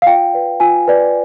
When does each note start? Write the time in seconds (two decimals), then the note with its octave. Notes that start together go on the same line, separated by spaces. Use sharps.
0.02 F5
0.06 F4 G5
0.33 B4 D5
0.60 F4 G#5
0.88 B4 D5